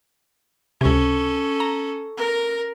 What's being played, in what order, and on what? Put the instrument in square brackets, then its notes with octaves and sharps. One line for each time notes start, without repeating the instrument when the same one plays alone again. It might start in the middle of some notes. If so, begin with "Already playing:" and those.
[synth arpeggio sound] C#2 C3 [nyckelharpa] C#4 A4
[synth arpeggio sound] A#5
[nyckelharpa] A#4